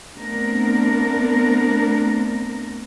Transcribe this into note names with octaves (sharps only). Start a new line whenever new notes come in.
A3 B3 C4 D4 A#4